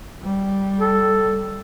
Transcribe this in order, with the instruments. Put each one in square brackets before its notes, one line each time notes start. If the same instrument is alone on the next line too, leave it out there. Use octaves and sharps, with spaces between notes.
[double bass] G3
[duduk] A4